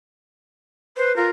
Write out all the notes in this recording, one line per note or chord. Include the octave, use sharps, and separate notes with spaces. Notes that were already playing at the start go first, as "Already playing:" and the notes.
B4 C5
F4 A#4